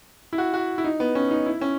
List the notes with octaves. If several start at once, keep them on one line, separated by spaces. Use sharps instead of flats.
E4
F#4
F#4
E4
D#4
B3
C#4
D#4
E4
C#4